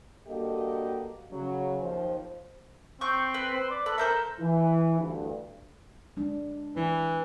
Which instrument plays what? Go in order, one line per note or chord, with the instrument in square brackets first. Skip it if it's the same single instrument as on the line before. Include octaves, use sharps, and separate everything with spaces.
[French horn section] G2 A#3 F#4 G4 A4 D#5
C#3 F#3
D#2 F3 C5
[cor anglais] C4 [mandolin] C#6 G6
[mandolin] B4
[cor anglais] C5
D5
[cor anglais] A4 [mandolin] B4
[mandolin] A4 C5 E5 [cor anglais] A#4
[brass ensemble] E3
D2 G2
[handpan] G#3 D4
[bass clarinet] E3 [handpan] E4